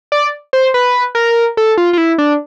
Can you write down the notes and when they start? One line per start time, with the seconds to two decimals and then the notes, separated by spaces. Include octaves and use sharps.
0.12 D5
0.53 C5
0.74 B4
1.15 A#4
1.57 A4
1.78 F4
1.93 F4
1.98 E4
2.18 D4